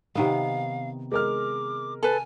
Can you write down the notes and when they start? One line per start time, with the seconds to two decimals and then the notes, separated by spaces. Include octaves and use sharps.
0.15 C3 D#3 B3 F5
1.12 G#3 A#4 D6 F6
2.03 A4 B4 G#5